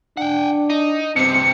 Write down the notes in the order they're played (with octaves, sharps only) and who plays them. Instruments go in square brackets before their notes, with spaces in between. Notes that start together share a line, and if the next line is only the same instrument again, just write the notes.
[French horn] D4 [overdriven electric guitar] F#5 G5
[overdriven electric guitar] D#4
[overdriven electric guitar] G2 C3 [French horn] C4 [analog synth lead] C#7